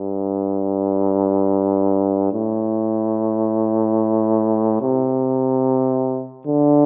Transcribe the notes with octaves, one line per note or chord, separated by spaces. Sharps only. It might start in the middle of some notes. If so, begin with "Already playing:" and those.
Already playing: G2
A2
C3
D3